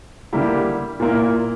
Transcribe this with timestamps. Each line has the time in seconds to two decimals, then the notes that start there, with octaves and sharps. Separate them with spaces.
0.33 D3 G3 A#3 E4 G4
1.00 A#2 A#3 E4